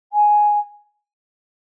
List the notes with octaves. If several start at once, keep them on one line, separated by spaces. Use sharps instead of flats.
G#5